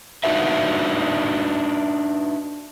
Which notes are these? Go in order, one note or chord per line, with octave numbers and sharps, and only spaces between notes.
D4 D#4 F#4 B4 E5